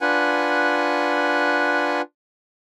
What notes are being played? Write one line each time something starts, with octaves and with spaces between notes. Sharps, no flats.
D4 F4 B4 F#5 G#5